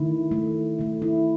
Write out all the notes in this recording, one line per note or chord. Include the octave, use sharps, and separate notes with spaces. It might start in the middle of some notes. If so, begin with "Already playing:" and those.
Already playing: D#3 A3 E4
D#3 A3
D#3 A3
E4